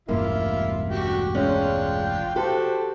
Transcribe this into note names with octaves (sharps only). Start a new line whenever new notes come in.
E1 A1 G2 A#3 E4 F4
D3 F#4 G4
G#3 C#4 D4 F4 G5
F#4 G4 A4 C5